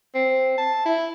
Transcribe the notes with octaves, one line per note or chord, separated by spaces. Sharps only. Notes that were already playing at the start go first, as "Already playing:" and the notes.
C4
A5
E4